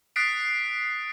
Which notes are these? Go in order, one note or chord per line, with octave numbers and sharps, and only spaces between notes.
D#6 F#6 A6 B6 C7 D7